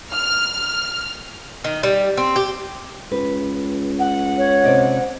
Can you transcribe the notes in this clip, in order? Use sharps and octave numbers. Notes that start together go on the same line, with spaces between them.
F6
D#3
G3
C4
G4
C#2 B4
F#5
C#5
C3 D5 D#5